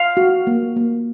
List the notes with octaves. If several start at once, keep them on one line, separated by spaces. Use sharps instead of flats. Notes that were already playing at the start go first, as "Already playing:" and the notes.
Already playing: F5
F#4
A#3
A#3